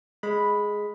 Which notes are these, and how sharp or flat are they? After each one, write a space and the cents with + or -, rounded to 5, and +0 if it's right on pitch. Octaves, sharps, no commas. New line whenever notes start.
G#3 +5 B5 +0